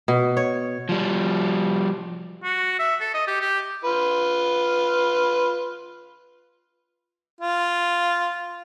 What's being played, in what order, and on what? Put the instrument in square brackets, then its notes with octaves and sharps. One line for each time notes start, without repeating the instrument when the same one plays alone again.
[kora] B2
C#5
[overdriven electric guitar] F3 G3
[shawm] F#4
E5
A4
D#5
G4
G4
[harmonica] F4 B4
F4